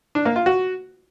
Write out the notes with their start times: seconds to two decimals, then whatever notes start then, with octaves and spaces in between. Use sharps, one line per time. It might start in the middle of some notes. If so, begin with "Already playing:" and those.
0.15 D4
0.25 A#3
0.36 F4
0.46 F#4